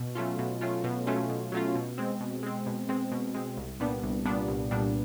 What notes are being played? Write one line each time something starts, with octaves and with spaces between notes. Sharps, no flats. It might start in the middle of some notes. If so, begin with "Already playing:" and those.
Already playing: B2
F#3 A3 C#4 F4
B2
F#3 A3 C#4 F4
B2
F#3 A3 C#4 F4
B2
F#3 A3 C#4 F4
B2
G#3 C4
B2
G#3 C4
B2
G#3 C4
B2
G#3 C4
C2
A#2 G3 B3 D4
C2
A#2 G3 B3 D4
C2
A#2 G3 B3 D4